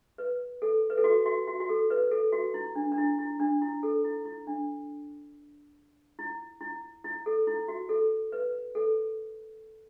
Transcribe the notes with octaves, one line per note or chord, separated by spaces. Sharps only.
B4
A4
B4
A4
F#4
F#4
F#4
F#4
A4
B4
A4
F#4
E4
D4
D4
E4
E4
D4
E4
A4
E4
E4
D4
E4
E4
E4
A4
E4
F#4
A4
B4
A4